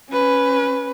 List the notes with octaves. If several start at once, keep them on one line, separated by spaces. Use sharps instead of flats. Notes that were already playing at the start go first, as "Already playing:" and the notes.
C#4 B4